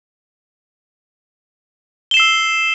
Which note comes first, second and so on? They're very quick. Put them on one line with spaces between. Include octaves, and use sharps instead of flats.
G7 E7 C7 E6